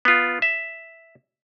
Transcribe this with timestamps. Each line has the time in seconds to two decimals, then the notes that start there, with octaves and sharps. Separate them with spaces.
0.05 B3 F4
0.42 E5